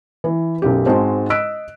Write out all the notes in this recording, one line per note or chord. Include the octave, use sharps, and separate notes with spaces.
E3
B1 F#2 G4
G#2 G#3 C4 F#4 C5 A5
D#5 E6 F#6 B6 D7